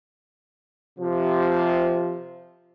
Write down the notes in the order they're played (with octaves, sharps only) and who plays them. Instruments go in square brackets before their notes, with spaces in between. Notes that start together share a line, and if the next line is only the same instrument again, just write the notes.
[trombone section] C3 F3